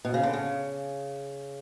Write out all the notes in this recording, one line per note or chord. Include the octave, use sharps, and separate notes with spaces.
B2
C#3
D3
C#3